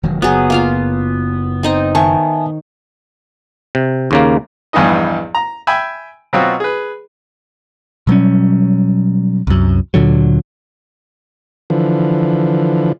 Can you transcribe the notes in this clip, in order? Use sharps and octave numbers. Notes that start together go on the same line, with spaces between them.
E1 D#3 F#3
F#1 F#3 B3 G#4
A#3 F4 F5
C4 D#4 D#5
D#3 E5 G#5 A5 C#6
C3
D#2 C#3 A#3
A#1 E2 G2 B3 D#4 D#5
A#5
E5 G5 G#5 B5
B2 F#3 C4 F4 F#4
G#4 B4
B2 F#3 G3 C#4
C2 F#2
D2 A#2 D3 F#3
D3 E3 F3